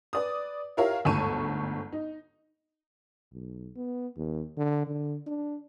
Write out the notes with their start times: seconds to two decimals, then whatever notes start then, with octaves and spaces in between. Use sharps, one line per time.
0.13 B4 D5 D#6
0.77 E4 F4 G4 A#4 C#5 F5
1.05 G1 D2 G#2 A5 C#6 D#7
1.92 D#4
3.33 B1
3.76 B3
4.17 D#2
4.58 D3
4.87 D3
5.27 D4